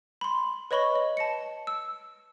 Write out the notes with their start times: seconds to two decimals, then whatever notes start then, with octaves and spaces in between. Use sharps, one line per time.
0.21 B5 C6
0.71 B4 C#5 D#5 B5 C#6 G7
0.95 D#5
1.17 A5 A#6 C#7
1.67 E6